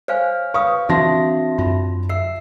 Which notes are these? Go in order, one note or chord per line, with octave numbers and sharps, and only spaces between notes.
C5 C#5 F5 G#5 F6
B4 F5 C#6 D#6
E3 C4 D4 F#4 E5 A5 C6 A#6
F#2 F4
E5 E6 C7